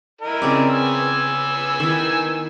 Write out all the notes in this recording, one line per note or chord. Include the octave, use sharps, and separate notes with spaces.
E4 A#4 D#5
C#3 C4 D5
B3 G#5 E6
D#3 E4